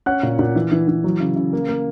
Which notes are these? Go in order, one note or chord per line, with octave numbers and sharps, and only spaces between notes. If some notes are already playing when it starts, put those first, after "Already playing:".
C#4 F#5 F#6
A#2
A#2
E3
E3
E3
F#3
C#3
C#3
A#3
A#3